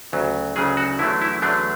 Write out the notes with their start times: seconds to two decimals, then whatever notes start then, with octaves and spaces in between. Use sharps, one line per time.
0.13 D2 C#3 F#3
0.56 D2 C#3 F#3 G#4
0.77 F#4
0.99 E2 D3 F#3 A3 E4
1.21 E4
1.42 E2 D3 F#3 A3 D4